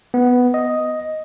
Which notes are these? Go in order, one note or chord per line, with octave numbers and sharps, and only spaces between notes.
B3
D#5